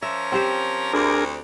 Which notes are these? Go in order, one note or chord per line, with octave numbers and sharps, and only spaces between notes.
F3 C#4 A#4 E5
C4 G4 C5
D2 D4 G#4 A#4